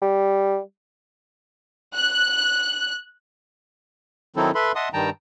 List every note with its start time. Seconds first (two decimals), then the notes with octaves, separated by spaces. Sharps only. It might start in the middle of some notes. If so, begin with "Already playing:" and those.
0.02 G3
1.95 F#6
4.36 D#3 F#3 C4 D#4 E4 A4
4.55 A4 B4 E5 B5 C6
4.75 D#5 E5 F#5 A5 C6 D#6
4.93 G2 D#3 G3 G5 A5 A#5